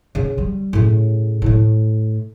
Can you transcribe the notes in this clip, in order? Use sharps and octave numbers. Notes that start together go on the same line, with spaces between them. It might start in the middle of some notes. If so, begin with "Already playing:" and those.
C#3
G3
A2 C#3
A2 A3